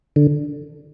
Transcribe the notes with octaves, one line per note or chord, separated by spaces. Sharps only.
D3